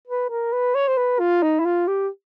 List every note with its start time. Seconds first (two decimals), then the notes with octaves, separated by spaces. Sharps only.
0.07 B4
0.30 A#4
0.53 B4
0.75 C#5
0.88 C5
0.98 B4
1.20 F4
1.42 D#4
1.60 E4
1.65 F4
1.88 G4